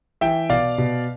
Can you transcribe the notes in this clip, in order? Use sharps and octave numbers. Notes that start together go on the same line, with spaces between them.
E3 E5 G5
B2 D5 F5
B2